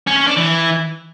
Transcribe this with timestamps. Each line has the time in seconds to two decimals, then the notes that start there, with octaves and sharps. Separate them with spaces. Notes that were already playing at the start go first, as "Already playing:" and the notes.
0.07 C#4
0.17 C#4
0.27 D4
0.37 E3